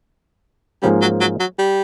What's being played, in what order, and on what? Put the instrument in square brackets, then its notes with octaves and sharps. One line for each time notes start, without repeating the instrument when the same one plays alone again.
[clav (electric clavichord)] G#2 F3 A#3 C#4 [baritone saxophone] G3
[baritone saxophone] F#3
F#3
F#3
G3